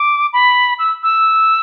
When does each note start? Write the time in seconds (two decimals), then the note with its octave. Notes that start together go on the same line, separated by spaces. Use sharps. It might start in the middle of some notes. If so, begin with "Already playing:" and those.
Already playing: D6
0.33 B5
0.79 E6
1.03 E6